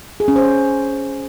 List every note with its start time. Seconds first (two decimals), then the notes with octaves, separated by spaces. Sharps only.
0.20 G#4
0.28 C#4
0.36 C5